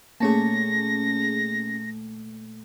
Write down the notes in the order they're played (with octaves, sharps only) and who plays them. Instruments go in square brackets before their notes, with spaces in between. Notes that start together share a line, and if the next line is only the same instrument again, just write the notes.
[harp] A#2 A3 A5 [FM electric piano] A#3 C#4 G#4 [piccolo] A#6